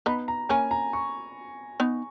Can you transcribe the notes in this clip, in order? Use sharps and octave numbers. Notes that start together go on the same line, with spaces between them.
B3 D#4 B5
A#5
A#3 C#4 G#5
A#5
C#6
B3 D#4